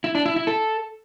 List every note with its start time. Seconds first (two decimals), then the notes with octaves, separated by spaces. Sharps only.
0.04 E4
0.15 D4
0.26 E4
0.36 E4
0.47 A4